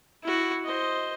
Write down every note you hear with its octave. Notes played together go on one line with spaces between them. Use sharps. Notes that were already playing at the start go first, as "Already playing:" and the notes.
E4 F#4
C5 D#5